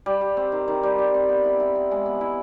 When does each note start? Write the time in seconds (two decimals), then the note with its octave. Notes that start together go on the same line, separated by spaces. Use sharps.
0.06 G3
0.21 G3
0.37 C4
0.52 D#3
0.68 D#3
0.83 G3
0.99 G3
1.15 C4
1.29 B3
1.45 E4
1.60 E4
1.75 B3
1.91 G#3
2.06 B3
2.21 E4